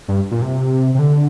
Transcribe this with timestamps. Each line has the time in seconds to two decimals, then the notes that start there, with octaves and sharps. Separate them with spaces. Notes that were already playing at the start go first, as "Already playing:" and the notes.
0.08 G2
0.31 A#2
0.42 C3
0.95 C3
0.99 D3